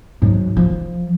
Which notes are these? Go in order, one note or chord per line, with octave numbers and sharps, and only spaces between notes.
G#2 F#3
F3